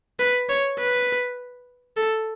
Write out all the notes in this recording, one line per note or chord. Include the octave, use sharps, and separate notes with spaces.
B4
C#5
B4
A4